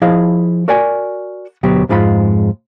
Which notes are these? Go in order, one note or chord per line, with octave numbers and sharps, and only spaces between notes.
F3 E4 G#4 D#5 F5
F#4 A#4 D5 G5 G#5
D2 B2 F#3 G4
F2 G#2 G#3 F4 B5